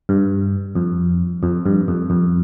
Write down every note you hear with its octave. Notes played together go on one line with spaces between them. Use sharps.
G2
F2
F2
G2
F2
F2